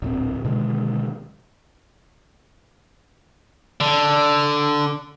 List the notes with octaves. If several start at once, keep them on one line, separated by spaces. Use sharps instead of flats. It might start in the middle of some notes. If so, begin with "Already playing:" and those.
D1 A#1 C4
B2 D3 D#3 G#3
D3